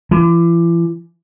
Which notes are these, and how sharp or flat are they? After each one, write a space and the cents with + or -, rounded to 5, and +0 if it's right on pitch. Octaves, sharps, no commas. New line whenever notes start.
E3 +40